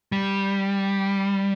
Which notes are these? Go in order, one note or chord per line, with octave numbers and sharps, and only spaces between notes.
G3